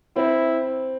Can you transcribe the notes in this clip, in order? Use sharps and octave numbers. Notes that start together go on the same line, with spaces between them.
C4 E4